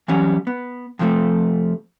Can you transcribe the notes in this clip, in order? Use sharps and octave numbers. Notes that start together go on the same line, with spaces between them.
E3 F#3 G3 C#4
B3
F2 C3 F3 G#3 A3